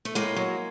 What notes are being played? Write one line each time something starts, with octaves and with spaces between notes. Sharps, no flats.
A3
A2 G#3 A#3
F#3